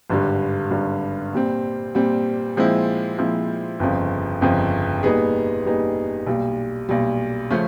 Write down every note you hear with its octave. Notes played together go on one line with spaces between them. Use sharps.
G#1 G2 D3 G3
G#1 G2 D3 G3
A#2 G3 C4
A#2 G3 C4
A#2 F3 G#3 C4 E4
A#2 F3 G#3 C4 E4
G1 F2 C#3 F3
G1 F2 C#3 F3
A#2 G3 B3 D#4 G#4
A#2 G3 B3 D#4 G#4
B1 A#2 G3
B1 A#2 G3
C#3 F3 A3 C#4